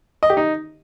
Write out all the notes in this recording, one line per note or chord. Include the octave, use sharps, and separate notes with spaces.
D#5
G4
D#4